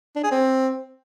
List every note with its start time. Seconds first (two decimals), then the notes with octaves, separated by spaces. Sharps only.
0.16 D4
0.24 G#4
0.32 C4